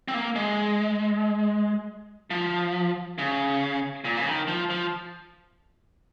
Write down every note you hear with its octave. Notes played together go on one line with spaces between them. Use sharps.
C4
A#3
G#3
F3
C#3
A#2
C#3
D#3
F3
F3